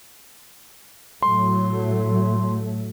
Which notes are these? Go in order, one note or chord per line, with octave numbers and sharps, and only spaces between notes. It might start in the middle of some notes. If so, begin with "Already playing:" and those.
A2 F#3 A3 C6